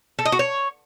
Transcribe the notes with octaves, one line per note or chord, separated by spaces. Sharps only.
A4
D#5
F#4
C#5